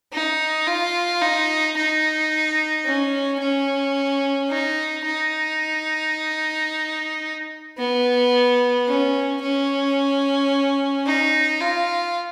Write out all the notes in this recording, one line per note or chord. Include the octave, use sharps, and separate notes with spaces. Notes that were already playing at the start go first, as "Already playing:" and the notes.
D#4
F4
D#4
D#4
C#4
C#4
D#4
D#4
B3
C#4
C#4
D#4
F4